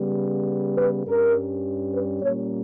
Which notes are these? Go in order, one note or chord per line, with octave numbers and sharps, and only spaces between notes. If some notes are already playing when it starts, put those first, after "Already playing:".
Already playing: C#3 G3 B3
B4
G2 G3 C#4 A#4
B4
A#2 G3 A#3 C#4 C#5